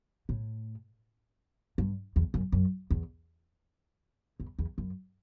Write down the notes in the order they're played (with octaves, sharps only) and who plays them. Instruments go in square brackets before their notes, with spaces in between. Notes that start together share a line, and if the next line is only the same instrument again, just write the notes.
[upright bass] A2
G2
E2
F#2
F#2
E2
E2
E2
F#2